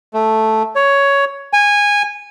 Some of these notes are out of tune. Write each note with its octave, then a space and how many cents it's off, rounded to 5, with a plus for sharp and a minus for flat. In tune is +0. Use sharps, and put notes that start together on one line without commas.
A3 -5
C#5 +10
G#5 -15